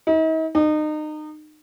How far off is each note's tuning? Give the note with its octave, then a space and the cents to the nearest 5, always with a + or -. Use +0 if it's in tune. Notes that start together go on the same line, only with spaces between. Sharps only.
D#4 +45
D#4 -30